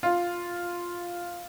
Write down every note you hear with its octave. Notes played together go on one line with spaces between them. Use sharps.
F4